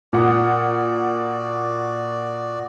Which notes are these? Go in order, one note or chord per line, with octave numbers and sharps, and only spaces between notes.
A#2 F#4 D5 F#5 D6 D#6